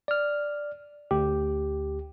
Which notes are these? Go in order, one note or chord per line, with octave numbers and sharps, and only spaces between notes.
D5 F6
D2 G4